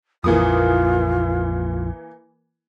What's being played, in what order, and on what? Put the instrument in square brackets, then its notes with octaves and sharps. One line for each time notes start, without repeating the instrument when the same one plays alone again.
[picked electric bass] A#1 F2 [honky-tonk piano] E3 A#3 D#6 [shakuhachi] F4